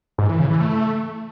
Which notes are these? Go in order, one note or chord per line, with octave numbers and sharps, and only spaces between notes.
G#2
E3
C#3
E3
A3